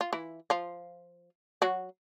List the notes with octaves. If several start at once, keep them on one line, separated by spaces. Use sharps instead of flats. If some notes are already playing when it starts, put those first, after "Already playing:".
F4
E3 E4
F3 F4
F#3 F#4